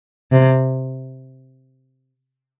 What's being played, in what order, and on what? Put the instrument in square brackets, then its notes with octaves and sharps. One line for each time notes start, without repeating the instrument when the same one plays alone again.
[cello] C3